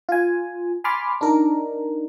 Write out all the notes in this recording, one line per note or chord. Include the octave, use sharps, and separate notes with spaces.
F4 G#5
G#5 B5 C6 D6 F6 A6
D4 D#4 A#4